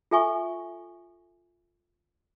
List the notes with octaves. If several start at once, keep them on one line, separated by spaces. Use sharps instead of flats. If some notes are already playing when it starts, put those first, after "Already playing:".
F4 A4 E5 G#5 C#6